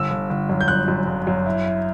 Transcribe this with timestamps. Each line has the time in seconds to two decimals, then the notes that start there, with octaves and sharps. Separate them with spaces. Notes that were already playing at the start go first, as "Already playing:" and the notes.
Already playing: G1 E6
0.11 G1
0.30 G1
0.49 F#2
0.61 G6
0.68 G1 F#6
0.88 F#2
1.07 G1
1.27 F#2
1.46 E4
1.66 E4